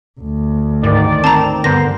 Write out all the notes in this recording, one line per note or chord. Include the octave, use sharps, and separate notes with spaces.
D2
G#2 D#3 D5
C4 A5 A#5
G2 D3 B3 A#4 C5 A#6